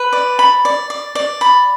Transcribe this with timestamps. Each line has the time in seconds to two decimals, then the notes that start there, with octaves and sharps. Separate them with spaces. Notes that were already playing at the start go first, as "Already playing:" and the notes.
Already playing: B4
0.13 D5
0.39 B5
0.65 D5
0.90 D5
1.15 D5
1.41 B5